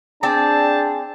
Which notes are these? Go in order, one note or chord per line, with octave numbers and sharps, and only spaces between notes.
C4 D4 G#4 D5 A5